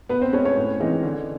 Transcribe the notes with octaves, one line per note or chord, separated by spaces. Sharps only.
B2 B3 B4
C4 C5
G#3 C#4 C#5
C#4 C#5
A2
E3 G#3 C4 D#4
D3